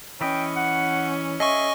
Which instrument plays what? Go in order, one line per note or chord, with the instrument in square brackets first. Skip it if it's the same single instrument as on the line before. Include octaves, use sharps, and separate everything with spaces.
[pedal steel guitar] E3 B4 D#5 [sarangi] C#4 [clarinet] G5
[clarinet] F#5
[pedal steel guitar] G#4 [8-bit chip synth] D#5 G#5 C#6 [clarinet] E5